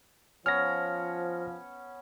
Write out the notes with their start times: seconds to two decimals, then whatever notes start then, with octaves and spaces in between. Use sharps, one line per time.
0.46 F3 B3 C#4 F6 A#6